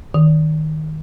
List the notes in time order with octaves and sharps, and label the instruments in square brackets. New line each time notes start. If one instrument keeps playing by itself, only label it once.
[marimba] D#3